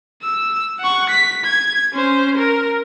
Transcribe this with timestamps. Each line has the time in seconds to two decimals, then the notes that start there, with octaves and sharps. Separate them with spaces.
0.22 E6
0.80 F#5 C#6
1.09 B6
1.44 G#6
1.93 C#4 C5
2.37 A#4